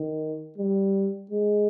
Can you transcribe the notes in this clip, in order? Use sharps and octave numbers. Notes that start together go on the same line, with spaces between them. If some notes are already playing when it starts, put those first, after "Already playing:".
Already playing: D#3
G3
G#3